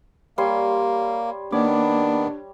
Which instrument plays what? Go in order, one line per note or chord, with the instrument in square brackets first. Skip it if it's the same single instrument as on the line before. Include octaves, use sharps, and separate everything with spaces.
[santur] G3 C#5 C6 [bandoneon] A#3
[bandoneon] D#3 B3 [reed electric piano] A#3 B5 D6 [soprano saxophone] D4 [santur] C#5